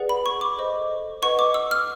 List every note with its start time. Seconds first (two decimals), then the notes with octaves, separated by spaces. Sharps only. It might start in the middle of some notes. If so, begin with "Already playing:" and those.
Already playing: G#4 B4 D5 F#5
0.09 B5
0.26 C#6
0.41 D6
0.58 A4 C5 D#5
1.22 B4 D#5 F#5 C#6
1.39 D6
1.54 E6
1.71 F6